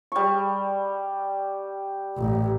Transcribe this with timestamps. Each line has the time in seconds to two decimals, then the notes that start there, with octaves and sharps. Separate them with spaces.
0.12 G3 C#6
2.18 A1